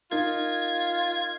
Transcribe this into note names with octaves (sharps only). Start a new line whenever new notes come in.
D#4 F4 A#4 G#6